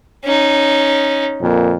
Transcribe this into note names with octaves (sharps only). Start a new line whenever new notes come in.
C#4 D#4
F2 A#2